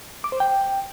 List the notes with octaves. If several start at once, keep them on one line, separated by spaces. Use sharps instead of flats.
D6
C5
G5